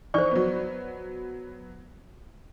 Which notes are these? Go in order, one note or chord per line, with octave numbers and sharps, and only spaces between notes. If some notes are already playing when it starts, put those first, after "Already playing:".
E3 D#4 C5 D5 C#6
F#3 B3